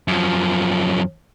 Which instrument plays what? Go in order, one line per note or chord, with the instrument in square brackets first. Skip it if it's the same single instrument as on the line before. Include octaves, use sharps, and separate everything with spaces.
[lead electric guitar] F#2 F3